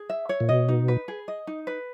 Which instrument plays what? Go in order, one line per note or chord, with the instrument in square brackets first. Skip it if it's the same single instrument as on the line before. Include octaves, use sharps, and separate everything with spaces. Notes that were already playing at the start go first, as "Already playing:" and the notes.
Already playing: [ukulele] G#4
E5
C#5
[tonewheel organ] A#2
[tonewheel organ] B2 [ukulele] D#5
[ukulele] D#4
B4
G#4
D#5
D#4
B4